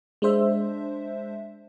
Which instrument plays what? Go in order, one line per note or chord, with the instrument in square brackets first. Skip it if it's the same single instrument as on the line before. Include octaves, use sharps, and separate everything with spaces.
[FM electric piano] G#3 D4 C5 E5